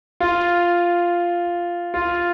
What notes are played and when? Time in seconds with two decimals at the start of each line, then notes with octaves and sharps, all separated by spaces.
0.20 F4
1.94 F4